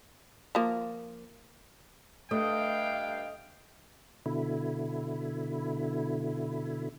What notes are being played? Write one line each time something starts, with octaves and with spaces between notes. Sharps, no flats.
F3 A#3
G2 A3 D#5 F5 G5
B2 D3 E4